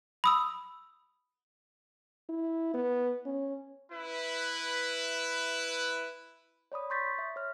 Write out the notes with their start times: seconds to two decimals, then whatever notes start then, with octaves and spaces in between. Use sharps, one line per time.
0.24 B5 D#6 E6
2.29 E4
2.74 B3
3.26 C#4
3.91 E4 B4
6.72 C#5 D5 B5 D#6
6.90 C6 C#6 G6 A6 B6
7.19 E5
7.36 C#5 F6